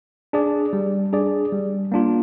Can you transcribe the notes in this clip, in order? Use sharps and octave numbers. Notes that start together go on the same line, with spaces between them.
D4 G#4 D5
G3
D4 G#4 D5
G3
A#3 D4 F4